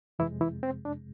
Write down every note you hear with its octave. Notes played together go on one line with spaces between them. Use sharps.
F2 C3 E3 G#3 E4
E3 E4
C4
D4